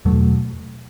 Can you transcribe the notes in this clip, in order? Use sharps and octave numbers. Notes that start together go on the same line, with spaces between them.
E2 B2 F#3 A3